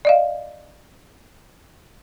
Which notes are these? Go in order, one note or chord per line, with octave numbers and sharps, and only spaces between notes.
D5 D#5 F5